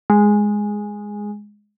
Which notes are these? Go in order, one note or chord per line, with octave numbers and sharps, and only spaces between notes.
G#3